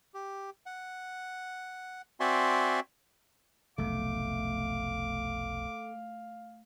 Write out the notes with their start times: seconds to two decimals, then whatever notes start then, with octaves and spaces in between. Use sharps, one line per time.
0.14 G4
0.66 F#5
2.20 C4 F#4 D5 E5 G#5 C6
3.78 F1 B1 A3 F5 D6